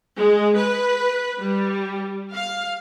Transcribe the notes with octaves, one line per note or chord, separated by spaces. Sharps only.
G#3
B4
G3
F5